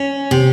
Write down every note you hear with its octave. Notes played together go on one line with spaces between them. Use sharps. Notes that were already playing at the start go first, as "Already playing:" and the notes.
Already playing: C#4
C3